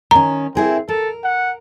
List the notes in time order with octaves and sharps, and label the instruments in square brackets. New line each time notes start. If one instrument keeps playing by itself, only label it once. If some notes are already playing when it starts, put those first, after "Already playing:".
[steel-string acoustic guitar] D#3 C#4 [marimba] A#5
[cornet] C4 [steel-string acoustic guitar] E4 G#4 A#4
[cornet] A4 [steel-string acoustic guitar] A#4
[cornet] F#5